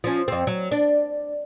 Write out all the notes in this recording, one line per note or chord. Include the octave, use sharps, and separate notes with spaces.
F3 C#4
F2 C4
F#3
D4